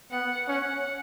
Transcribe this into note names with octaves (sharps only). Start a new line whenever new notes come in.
B3 F#5
C#4 F#5